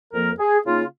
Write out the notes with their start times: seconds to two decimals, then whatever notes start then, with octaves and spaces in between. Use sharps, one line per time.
0.13 F2 F3 A#3 A#4
0.40 G#4
0.65 C#3 A#3 D#4 F4